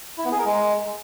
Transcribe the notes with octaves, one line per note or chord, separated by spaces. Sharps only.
E4
B3
G#4
A#4
G#3